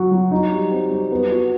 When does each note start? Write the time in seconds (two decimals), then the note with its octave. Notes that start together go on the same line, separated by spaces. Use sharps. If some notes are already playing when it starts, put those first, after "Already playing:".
Already playing: F#3 F#4
0.12 F#3
0.31 D#4
0.52 G3
0.71 C4
0.91 G3
1.12 B3
1.31 F#4